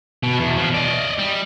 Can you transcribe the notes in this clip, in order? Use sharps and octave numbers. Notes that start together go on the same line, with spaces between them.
B2
E2
B2 F3
D5 D#5
G3